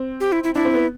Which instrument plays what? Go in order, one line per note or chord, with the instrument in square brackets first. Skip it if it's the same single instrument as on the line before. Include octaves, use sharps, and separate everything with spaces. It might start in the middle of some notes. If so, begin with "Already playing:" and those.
Already playing: [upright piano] C4
[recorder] G4
E4
E4
[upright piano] D4 [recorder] E4
[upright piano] C4
B3